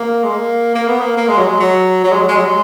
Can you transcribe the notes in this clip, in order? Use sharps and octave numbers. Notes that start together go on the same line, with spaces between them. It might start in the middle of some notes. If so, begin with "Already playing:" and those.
Already playing: A#3
G#3
A#3
A#3
B3
A#3
A#3
G#3
F#3
G#3
F#3
F#3
G#3
F#3
G#3
F#3
G#3